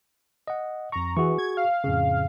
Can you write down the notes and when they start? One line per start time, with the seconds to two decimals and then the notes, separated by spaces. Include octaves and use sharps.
0.48 D#5 F#5
0.92 F2 A#5 C#6
1.17 E3 F#4 G#4 C#6
1.38 G#6
1.57 F5
1.84 F2 A2 C#3